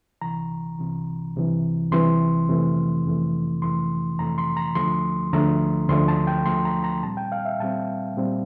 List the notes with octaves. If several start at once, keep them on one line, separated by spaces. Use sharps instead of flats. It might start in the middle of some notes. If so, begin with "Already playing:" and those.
C2 C3 E3 A#5
C2 C3 E3
C2 C3 E3
C2 C3 E3 C6
F2 C3 E3 A3
F2 C3 E3 A3
F2 C3 E3 A3 C6
F2 C3 E3 A3 A#5
C6
A#5
D2 D3 F3 A3 C6
D2 D3 F3 A3 A#5
D2 D3 F3 A3 C6
A5
G5
D2 D3 F3 A3 C6
A#5
A#5
A#2 G3 C4 A5
G5
F5
E5
A#2 G3 C4 A5
A#2 G3 C4